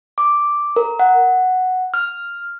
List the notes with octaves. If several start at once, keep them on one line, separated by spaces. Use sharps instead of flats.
D6
A#4
F#5
F6